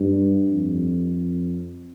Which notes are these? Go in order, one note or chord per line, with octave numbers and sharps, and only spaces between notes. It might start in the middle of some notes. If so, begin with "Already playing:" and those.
Already playing: G2
F2